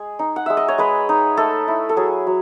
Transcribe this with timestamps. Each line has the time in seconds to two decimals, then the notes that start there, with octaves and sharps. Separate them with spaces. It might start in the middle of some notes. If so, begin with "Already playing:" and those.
Already playing: G#3 G#4
0.19 D#4
0.36 F#5
0.46 G#3 E5
0.57 D#5
0.68 C#5
0.78 G#3 B4
1.09 D#4
1.37 A3 A4
1.68 E4
1.89 A4
1.97 F#3 G#4
2.27 F#3